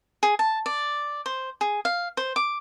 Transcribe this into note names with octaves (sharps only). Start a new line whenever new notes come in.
G#4
A5
D5
C5
G#4
F5
C5
D6